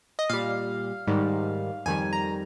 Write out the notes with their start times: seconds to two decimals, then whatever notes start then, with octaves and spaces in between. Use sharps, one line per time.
0.19 D#5
0.29 A#2 G3 F5
1.07 G#2 D#3 G3
1.86 F2 D#3 G3 G#5
2.13 A#5